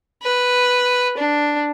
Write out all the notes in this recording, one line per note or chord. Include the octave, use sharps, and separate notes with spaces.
B4
D4